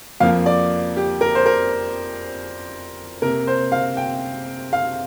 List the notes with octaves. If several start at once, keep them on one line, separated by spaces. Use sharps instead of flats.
F2 F3 A#3 F5
D5
G4
A#4
C5
A#4
C3 A#3 A#4
C5
F5
G5
F5